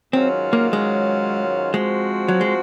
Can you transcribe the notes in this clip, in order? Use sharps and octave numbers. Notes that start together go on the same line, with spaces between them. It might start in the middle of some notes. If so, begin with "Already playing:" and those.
G#2 D#3 F#3 C4 C#4 F4
A#3
G#3
F3 G#3 C4 F#4
F#3
G#3